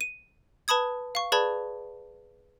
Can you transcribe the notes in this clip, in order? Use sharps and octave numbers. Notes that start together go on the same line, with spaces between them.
D#7
B4 A5 B5 D#6 G#6
F5 C#6
G#4 B4 D5 A5 B5 G#6